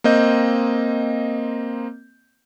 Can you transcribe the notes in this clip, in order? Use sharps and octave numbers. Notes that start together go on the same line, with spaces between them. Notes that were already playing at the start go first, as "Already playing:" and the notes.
A#3 C4 D#5 G6